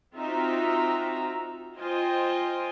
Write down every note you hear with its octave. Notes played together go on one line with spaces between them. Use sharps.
C4 D#4 F4 F#4 E5 A#5
F4 C5 D#5 G5 G#5